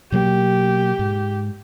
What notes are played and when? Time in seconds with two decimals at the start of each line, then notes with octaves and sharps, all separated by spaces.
0.12 B2 F#3 A#3 G4
0.99 G#2